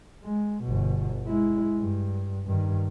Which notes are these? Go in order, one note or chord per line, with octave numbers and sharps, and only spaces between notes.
G#3
G1 B2
G#3 E4
G2
G2 D#3